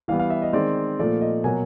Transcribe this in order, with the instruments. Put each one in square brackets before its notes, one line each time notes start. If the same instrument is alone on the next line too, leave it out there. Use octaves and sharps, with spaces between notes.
[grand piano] E3 G3 B3 F5
F5
E5
D#5
D#3 G#3 C4 D5
A#2 F3 A3 D5
D#5
B2 F#3 A#3 G#5